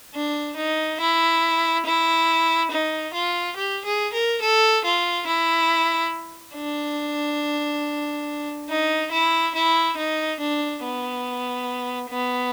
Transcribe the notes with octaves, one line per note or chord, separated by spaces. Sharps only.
D4
D#4
E4
E4
D#4
F4
G4
G#4
A#4
A4
F4
E4
D4
D#4
E4
E4
D#4
D4
B3
B3